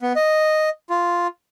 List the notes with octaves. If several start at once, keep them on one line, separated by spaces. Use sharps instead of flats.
B3
D#5
F4